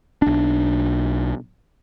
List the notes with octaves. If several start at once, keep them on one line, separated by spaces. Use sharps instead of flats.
B1 D4